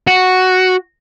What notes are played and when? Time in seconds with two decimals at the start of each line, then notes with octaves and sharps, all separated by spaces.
0.07 F#4